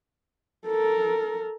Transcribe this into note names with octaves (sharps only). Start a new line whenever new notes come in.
A4 A#4